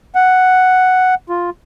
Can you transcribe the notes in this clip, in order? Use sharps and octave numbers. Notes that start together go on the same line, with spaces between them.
F#5
F4